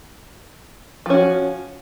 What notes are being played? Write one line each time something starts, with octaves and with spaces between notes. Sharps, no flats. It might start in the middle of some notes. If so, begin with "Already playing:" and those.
F3 C#4 F#4